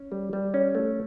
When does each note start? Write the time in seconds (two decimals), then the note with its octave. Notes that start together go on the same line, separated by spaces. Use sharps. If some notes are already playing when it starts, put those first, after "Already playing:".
Already playing: C#4
0.12 G3
0.33 G3
0.54 C#4
0.75 A3